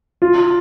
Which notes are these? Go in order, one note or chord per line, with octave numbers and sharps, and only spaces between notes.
F4